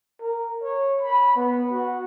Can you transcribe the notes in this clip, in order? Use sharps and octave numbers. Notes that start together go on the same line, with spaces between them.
A#4
C#5
B5
B3
F#4